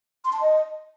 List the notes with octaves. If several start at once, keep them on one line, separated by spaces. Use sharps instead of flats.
C6
A5
D#5